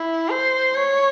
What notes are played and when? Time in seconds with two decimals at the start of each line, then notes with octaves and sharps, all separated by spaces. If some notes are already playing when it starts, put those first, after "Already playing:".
Already playing: E4
0.30 C5
0.75 C#5